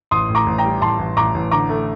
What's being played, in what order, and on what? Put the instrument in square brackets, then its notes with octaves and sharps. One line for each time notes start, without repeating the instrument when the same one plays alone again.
[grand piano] A1 C6 D#6
A2
A#5 D6
A1
G5 A#5
G3
A1 A5 C6
A1
A1 A#5 D6
A1
D3 A#5 D6
A3